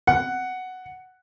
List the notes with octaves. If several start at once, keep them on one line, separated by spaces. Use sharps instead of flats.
F#5